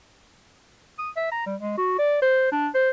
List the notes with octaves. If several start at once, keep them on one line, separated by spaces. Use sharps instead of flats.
D#6
E5
A#5
G3
G#3
F#4
D5
C5
D4
C5